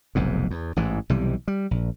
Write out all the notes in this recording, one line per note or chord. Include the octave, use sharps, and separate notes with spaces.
F1 B1 E2 G#2
E2
A1 G#2 E3
B1 C3 E3 G3
G3
A#1